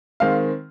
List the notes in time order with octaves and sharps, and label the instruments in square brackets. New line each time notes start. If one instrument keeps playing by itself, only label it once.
[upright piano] D#3 G#3 C4 F5